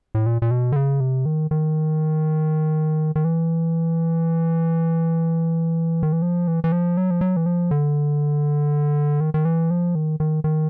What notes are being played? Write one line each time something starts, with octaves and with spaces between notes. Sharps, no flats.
A2
A#2
A#2
B2
D3
C#3
C3
D#3
D#3
D#3
E3
D#3
E3
F3
E3
E3
F3
F#3
F3
F#3
E3
F3
D3
D#3
D#3
E3
F3
D#3
D#3
D#3